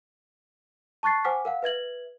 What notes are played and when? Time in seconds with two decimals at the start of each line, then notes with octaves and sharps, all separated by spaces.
1.03 A5 C#6 F#6 A6 C7
1.24 C5 F#5 G#5 D6 F6 B6
1.45 A#4 F5 F#5
1.63 B4 E5 G#6 F#7